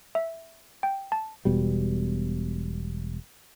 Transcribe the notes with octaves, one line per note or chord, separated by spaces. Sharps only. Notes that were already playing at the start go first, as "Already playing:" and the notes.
E5
G5
A5
E1 B2 G3